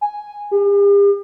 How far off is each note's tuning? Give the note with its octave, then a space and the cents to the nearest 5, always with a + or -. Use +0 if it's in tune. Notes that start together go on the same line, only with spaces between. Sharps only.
G#5 -5
G4 +45